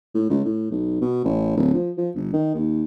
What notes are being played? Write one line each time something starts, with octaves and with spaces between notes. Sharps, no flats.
A2
C#2
A2
B1
B2
A1
D1
F3
F3
G1
D#3
D#2